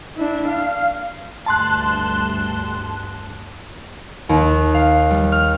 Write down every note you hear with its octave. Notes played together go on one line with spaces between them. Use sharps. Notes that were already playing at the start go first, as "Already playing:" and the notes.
D4 E4
F5
D2 G2 A5 C6 F#6
D#2
F5
G3
F6